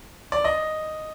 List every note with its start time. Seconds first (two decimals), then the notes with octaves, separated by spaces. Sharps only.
0.32 D5
0.44 D#5